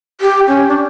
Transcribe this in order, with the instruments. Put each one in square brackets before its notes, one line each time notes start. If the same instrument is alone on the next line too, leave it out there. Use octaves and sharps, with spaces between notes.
[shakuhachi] G4
C#4
D4